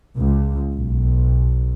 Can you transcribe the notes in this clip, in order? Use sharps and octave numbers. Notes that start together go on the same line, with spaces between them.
C#2
B1